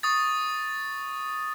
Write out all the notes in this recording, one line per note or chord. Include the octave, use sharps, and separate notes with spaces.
C#6 D#6 A6